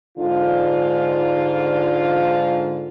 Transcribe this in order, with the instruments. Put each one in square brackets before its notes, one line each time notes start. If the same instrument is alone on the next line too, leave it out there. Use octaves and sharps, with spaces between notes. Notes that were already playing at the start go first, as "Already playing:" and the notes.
[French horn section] G#2 D3 F4